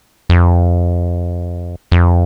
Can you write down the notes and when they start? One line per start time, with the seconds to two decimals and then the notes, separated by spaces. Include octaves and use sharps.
0.29 F2
1.92 F2